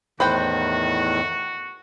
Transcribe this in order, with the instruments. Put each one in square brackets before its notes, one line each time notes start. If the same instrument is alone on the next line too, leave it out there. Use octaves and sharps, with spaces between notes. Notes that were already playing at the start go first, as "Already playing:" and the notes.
[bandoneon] E2 A2 D#3 [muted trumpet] F#4 [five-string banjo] B4 C5 G5